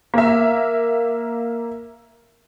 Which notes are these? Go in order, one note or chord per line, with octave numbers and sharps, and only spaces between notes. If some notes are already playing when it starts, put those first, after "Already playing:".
A#3 A#4 E5